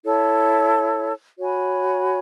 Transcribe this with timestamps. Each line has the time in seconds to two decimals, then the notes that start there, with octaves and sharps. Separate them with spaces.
0.04 E4 A4 C#5
1.39 F#4 C#5 G#5 B5